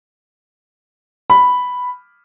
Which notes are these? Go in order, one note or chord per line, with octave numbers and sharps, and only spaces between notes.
B5